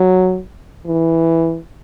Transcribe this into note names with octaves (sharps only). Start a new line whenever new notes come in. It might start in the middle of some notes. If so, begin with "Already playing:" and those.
Already playing: F#3
E3